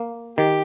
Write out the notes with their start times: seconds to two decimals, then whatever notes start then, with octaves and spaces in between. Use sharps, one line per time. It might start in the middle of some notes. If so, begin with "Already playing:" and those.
Already playing: A#3
0.38 D#3 G4